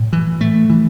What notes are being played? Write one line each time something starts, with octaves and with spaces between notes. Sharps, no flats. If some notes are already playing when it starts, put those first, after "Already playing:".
Already playing: A2
E3
A3
E3